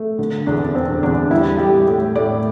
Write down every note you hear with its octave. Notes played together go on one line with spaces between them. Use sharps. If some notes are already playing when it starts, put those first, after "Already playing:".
Already playing: A3
D3
E2 D4
D4
D3 C4
E2 D4
G3 E4
G3 G4
A2
A2 D5